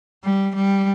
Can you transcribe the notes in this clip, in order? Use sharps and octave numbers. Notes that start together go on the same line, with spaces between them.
G3
G3